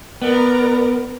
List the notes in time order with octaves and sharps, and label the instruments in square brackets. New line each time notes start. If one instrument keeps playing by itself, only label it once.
[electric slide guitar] B3 [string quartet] A#4 D5 A#5